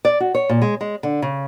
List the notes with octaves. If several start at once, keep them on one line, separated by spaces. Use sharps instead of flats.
D5
F#4
C#5
A#2
G#3
G#3
D3
C#3